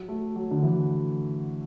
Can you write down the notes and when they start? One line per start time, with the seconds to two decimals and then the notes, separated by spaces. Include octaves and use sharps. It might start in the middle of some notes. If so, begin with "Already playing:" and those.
Already playing: F#3
0.08 A3
0.36 F#3
0.51 D3
0.63 E3